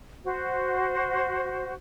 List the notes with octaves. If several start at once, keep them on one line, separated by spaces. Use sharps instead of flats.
F#4 C5